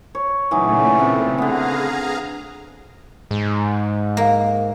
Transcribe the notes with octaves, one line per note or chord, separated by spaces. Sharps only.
C#5
A#2 C#3 E3 F#3 A3 D#4
C3
D3 B3 G#4 F5 A#5
G#2
A#3